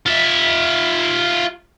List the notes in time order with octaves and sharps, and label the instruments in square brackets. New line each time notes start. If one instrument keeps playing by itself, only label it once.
[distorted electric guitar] F4 E5